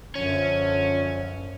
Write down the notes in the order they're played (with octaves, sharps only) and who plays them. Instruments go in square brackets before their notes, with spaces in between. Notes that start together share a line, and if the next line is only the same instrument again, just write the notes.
[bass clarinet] F#2 [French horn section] D3 F3 [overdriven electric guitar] C#4